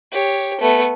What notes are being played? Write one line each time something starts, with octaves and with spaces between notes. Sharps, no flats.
G4 C#5
A3 B3